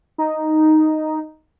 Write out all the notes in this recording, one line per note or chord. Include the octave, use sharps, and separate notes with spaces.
D#4